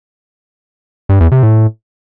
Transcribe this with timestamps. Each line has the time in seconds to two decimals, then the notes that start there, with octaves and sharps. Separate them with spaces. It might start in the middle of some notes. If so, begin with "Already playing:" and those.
1.09 G2
1.20 E2
1.32 C3
1.43 A2